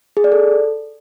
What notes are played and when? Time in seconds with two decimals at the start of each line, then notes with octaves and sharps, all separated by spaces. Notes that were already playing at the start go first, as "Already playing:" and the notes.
0.17 G#4
0.24 D5
0.32 A4